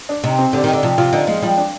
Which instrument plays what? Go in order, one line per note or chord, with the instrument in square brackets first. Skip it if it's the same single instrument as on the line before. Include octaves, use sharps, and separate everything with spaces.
[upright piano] D4
[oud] C3 [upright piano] D#4
[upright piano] C4
[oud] D3 [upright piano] G4
[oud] D#3 [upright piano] D#4
[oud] D3
[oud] C3 [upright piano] F3
[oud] C3 [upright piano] F4
[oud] D3 [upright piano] D#4
[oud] F3 [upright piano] G#3
[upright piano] F3 [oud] G3
[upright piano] D4